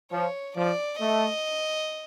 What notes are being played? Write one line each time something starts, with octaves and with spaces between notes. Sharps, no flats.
F3 C#5
F3 D5
A3 D#5